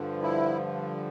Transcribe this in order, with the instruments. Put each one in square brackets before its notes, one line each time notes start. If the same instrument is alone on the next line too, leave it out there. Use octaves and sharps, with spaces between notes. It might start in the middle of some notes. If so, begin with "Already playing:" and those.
Already playing: [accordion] G2 D3 F3
E4